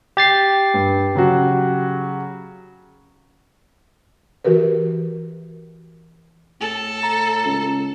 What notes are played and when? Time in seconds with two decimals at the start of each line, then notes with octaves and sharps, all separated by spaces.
0.17 G4 A6 C7
0.74 G2
1.15 C#3 F#3 F#4
4.45 E3 F#4 G4 A#4 B4
6.60 A2 A4
7.03 A#5
7.45 C#2